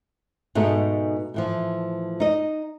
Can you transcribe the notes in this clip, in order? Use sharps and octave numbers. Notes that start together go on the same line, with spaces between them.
G#2 B2 A3 D#4 G#4
A2 E3 F3
D#4 D#5